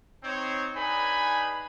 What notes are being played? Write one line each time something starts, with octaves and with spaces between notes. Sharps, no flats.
C4 D#4 C#5
D4 D#4 G#4 B4 G#5 B5